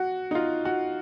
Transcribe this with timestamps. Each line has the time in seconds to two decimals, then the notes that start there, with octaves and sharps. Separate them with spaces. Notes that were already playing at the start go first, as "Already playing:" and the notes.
Already playing: F#4
0.31 D#4
0.35 F4
0.65 F#4